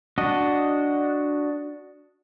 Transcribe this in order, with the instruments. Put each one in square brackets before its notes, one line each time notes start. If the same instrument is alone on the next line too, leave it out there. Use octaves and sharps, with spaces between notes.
[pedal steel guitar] D4 F#4 D#5